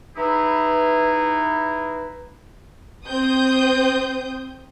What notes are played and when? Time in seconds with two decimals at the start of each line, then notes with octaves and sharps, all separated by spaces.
0.16 E3 D#4 E4 G#4 B4
3.08 C4 C5 D#6 G6